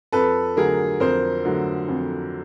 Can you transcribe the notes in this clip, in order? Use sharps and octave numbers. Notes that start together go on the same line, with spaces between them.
F2 A4 B4
D3 F#3 A3 G#4 A#4
F2 A#4 C5
D3 F#3 A3
F2